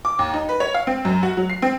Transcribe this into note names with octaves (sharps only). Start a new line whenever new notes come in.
D6
D#2
D#4
B4
C#5
F5
C4
F#2
F#4
F#3
C7
C4